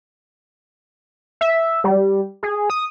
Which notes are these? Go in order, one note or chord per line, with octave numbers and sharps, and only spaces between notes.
E5
G3
G#4
D#6